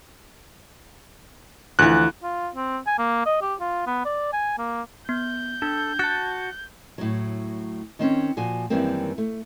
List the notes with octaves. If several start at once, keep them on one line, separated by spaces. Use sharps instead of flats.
D2 E3 F3 F#6
F4
C4
G#5
A#3
D#5
G4
F4
B3
D5
G#5
A#3
B3 G6
D4 A4
F#4 A5 F#6 A6 C#7
A2 F#3
D#3 C4 C#4 C#5
A#2 F3 F#4 G#5
F#2 D#3 E3 G3 A#3 C4
A3